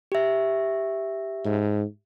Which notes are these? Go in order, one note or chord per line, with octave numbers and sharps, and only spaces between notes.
G4 E5
G#2